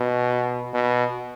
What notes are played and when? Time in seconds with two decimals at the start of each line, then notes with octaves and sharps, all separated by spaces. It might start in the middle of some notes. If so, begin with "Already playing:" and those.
Already playing: B2
0.74 B2